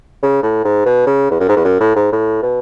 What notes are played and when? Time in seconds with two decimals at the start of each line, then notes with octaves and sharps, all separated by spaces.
0.23 C#3
0.43 A2
0.65 G#2
0.86 B2
1.06 C#3
1.30 E2
1.40 F#2
1.49 G#2
1.57 E2
1.65 F#2
1.81 A2
1.96 G#2
2.12 A2
2.43 B2